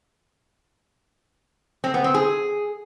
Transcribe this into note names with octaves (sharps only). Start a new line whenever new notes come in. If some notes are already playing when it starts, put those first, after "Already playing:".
C4
B3
C4
G#4